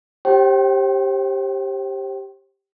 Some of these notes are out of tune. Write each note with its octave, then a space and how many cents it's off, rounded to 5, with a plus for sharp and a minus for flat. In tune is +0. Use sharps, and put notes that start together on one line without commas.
G4 +0 C5 +35 G5 -35